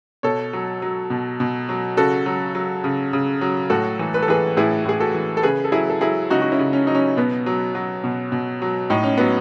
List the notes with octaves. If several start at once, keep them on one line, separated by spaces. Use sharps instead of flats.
B2 A4 C#5
F#3
F#3
B2
B2
F#3
C#3 F#4 A4
F#3
F#3
C#3
C#3
F#3
A2 F#4 A4
E3
B4
A4
E3 G#4 B4
A2 E4 G#4
A2 G#4
F#4 A4
E3
A4
C#3 G#4 B4
A4
F#3 E4 G#4
A4
F#3 E4 G#4
C#3 D#4 F#4
F#4
C#4 E4
C#3
C#4
F#3 D#4
C#4
B2 B3
F#3
F#3
B2
B2
F#3
A2 D#4
C#4
F#3 B3